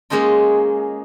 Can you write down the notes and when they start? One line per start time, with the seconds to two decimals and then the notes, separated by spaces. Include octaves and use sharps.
0.10 G#3 A#3 C#4 D#4 F4